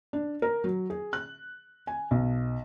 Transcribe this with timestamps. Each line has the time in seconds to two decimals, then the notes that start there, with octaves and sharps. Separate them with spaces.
0.13 D4
0.42 A#4
0.64 F#3
0.90 G#4
1.13 F#6
1.87 G#5
2.11 B1